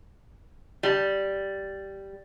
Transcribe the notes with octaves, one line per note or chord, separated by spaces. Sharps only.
G3